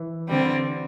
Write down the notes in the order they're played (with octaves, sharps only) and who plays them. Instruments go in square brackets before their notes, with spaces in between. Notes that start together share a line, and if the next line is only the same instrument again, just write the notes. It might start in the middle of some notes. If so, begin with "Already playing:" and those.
Already playing: [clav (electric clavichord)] E3
[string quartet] D3 G3 C4